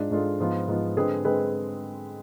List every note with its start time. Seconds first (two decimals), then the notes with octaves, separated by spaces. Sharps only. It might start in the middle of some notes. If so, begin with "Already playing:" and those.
Already playing: G#2 G#3 D4 F4
0.11 G#2 G#3 D4 F4 A4
0.40 G#2 F3 B3 F4
0.68 G#2 F3 B3 F4
0.96 D3 G#3 C4 G#4 B4
1.25 D3 G#3 C4 G#4 B4